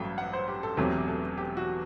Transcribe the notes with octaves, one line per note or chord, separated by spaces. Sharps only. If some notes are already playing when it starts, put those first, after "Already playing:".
Already playing: A1 G2 F#3 A3 G5
F#5
C5
G4
A4
E1 E2 C3 F#3 A3 G4
A4
G4
F#4